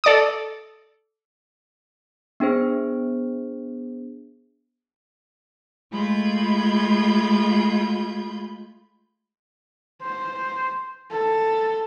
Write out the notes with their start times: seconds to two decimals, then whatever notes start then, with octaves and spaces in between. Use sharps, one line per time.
0.04 A4 D5 D6 D#6
2.40 B3 D4 G#4 C5
5.91 G#3 A3 F4 B5 G6 G#6
10.03 C5
11.11 A4